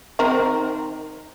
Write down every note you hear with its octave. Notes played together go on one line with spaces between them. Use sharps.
D#3 C4 A#4